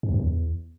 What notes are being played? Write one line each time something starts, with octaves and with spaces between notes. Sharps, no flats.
G#2
E2
G2
E2